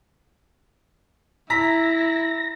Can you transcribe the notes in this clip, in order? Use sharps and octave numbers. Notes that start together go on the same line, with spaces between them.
E4 A#5 E6 A#6 B6